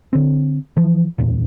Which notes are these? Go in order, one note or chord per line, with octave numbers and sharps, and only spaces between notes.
D3 C4
E3 F3
D1 E2 A#2